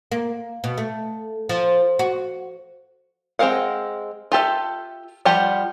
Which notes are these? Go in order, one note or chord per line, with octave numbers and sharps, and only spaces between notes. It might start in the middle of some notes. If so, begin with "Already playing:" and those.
A#3
B2
A3
F3
F#4
G#3 C4 A#4 F5 F#5
F4 G4 A4 E5
F3 G3 F4 G4 F#5